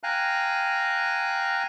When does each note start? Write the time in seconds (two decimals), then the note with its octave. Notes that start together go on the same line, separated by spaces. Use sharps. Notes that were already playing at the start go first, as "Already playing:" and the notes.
0.03 F5 G5 G#5 A#5 F#6